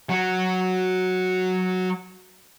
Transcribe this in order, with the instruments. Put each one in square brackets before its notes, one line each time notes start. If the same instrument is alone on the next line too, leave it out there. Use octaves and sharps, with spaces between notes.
[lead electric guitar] F#3 F#4